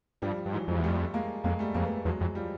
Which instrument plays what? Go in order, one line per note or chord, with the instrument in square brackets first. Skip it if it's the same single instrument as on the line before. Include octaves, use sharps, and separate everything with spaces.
[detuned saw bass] G2 [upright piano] F3 G3
[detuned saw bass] G2
[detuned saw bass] G#2 [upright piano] E3 F#3
[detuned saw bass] F2 [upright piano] F#3 G#3
[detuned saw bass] E2
[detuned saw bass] F2 [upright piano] G3 A3
[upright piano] G#3 A#3
[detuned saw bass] F2 [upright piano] G#3 A#3
[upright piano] G3 A3
[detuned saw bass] F2 [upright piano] G#3 A#3
[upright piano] A3 B3
[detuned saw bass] E2 [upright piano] F#3 G#3
[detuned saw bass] F2
[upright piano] F3 G3